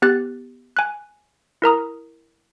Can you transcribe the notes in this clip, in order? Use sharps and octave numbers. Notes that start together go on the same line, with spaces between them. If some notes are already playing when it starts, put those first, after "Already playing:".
B3 G4 F#6 A6
G#5 F#6
E4 A#4 A#5 D#6